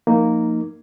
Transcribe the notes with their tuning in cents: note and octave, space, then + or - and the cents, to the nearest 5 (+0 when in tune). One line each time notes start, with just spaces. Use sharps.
F3 +10 A#3 -10 D#4 +0